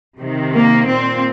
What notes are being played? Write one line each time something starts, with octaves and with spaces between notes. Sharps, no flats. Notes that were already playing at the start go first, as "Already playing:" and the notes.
C3 D#3
A#3
A#2 C4